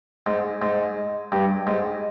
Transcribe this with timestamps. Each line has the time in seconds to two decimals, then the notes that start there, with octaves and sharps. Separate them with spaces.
0.26 G#2
0.62 G#2
1.32 G2
1.67 G#2